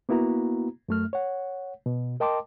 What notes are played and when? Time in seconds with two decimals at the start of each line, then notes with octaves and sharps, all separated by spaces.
0.09 A#3 B3 E4 F#4 A#5
0.89 F#2 A3 F6
1.13 C#5 F#5
1.86 B2
2.20 A#4 D#5 G5 A5 C6 D6